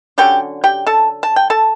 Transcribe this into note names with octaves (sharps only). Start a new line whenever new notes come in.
D3 F#3 C#4 G4 G5
G4 G5
A4 A5
A5
G5
A4 A5